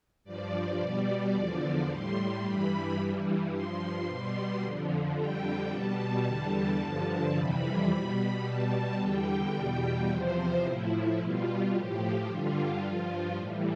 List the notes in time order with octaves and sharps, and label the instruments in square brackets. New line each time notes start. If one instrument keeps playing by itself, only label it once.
[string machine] G2 F3 D5
B2 G3
E2 D3 F3
A2 G3 C6
G2 E3 G3 B5
G2 E3 G3
G2 F3 C6
B2 G3
F2 D3 F3
F2 D3 G3 G5
B2 G3 A5
E2 D3 G3
G2 D3 F3 A5
F2 C3 E3 G3 B5
B2 G3
B2 G3 A5
E2 D3 G3 G5
E2 B2 G3
E2 C3 F3 C5
A2 F3 E4
B2 G3 F4
A2 F3 G4
G2 D3 G3 F4
G2 F3 F4
A2 E3 G3